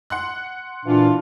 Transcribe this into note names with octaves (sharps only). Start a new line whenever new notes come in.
F#5 C6 F#6
A#2 E3 D4 F4